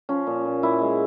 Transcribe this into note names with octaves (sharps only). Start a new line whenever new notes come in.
F3 C#4
A#2
A#2
A#2 E4
G#3